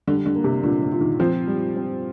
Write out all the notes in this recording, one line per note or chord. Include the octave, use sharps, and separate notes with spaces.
D3 G3
D3
A#3
C3
A#2 D3
D3
A#2
D#3
F3 C4
G3
C4